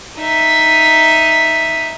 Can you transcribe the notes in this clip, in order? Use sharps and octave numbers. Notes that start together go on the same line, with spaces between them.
D#4 E5